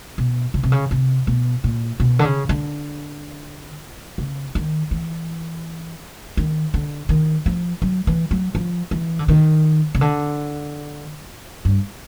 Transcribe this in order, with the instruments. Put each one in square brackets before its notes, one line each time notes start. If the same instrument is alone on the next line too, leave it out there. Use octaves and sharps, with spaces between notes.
[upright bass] B2
C#3
C3
C#3
C3
B2
A#2
B2
D3
C#3
D3
C#3
D#3
E3
D#3
D3
D#3
F3
F#3
E3
F#3
F3
E3
D3
D#3
C#3
D3
G2